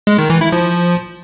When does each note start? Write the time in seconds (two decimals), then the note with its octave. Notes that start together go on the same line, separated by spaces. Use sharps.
0.07 G#3
0.18 D#3
0.30 E3
0.41 E4
0.52 F3